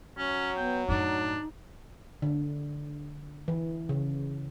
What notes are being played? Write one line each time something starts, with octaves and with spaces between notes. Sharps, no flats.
F#3 C#4
B3 G5
F#2 A2 D4 D#4
D3
E3
C#3